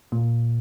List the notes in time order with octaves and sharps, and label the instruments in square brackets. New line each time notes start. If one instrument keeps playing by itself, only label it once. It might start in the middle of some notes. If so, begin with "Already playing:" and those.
[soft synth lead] A#2